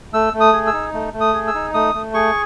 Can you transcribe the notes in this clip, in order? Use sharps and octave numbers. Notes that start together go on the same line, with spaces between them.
A3 E6
A3
D#6
G#4
E6
D#4
A3
A3
D#6
G#4
E6
D#4
A3 D#6
A3
G#4 C#6